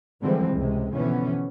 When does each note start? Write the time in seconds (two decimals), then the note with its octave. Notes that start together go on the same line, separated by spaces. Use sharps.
0.21 D3 E3 F3 G3 G#3 C4
0.54 C#2 A2 C3 G#3
0.93 B2 D3 E3 F3 B3 C#4